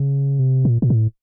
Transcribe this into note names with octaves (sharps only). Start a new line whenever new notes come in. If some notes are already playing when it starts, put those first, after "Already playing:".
Already playing: C#3
C3
A#2
A#2
A2